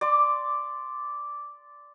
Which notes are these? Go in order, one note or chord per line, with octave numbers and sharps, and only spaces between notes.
D5 C6 D6